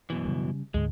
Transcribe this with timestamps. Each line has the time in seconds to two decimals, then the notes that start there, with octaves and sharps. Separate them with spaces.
0.10 F#2 B2 E3
0.25 C#3 G3
0.74 D2 G#2 D3 G#3